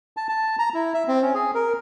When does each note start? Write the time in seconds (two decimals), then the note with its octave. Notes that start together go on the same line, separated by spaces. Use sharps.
0.17 A5
0.29 A5
0.59 A#5
0.74 E4
0.94 E5
1.08 C4
1.22 C#4
1.34 G#4
1.54 A#4